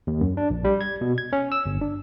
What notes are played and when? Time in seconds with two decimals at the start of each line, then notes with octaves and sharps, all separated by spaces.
0.07 D#2
0.21 F#2
0.37 D4
0.50 A#1
0.64 G3
0.81 G#6
1.01 B2
1.18 G#6
1.33 C#4
1.52 E6
1.66 G1
1.81 D4